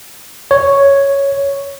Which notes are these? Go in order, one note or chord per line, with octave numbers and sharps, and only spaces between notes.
C#5